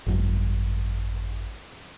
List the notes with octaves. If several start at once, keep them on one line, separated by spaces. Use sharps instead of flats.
G#1 F#2